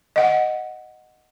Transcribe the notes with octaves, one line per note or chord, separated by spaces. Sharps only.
D#5 F#5